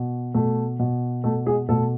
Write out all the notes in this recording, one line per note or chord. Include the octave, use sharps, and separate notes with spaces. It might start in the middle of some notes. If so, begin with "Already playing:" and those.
Already playing: B2
B2 A3
B2
B2 A3
G#3 G#4
B2 A3 A4